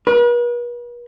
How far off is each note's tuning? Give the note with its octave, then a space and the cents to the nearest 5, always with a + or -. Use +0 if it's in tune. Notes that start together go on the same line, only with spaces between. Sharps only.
B4 -45